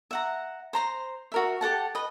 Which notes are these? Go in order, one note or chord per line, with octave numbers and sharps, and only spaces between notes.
E5 F#5 A#5
C5 A#5 C6
F#4 A#4 E5
G4 A4 F#5 A5
B4 D#5